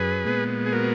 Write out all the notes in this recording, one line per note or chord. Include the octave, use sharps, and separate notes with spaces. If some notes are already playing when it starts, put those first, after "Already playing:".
Already playing: F#2 G#4 B4
A#2 G#3 B3
G#4
F#4 A#4